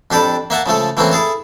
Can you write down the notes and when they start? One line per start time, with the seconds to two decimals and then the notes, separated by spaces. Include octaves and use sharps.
0.11 F2 D4 G4 A4 B5 D6
0.50 A#3 E5 F#5 A5
0.66 C#3 F3 A3 A4
0.97 E3 A3 A#3 C4 C#4
1.12 E4 G#4 A4 A5